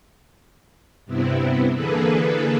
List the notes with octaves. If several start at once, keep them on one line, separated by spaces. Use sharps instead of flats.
G2 C3 B3 C4 E4
D3 E3 A#3 G#4 A4 B4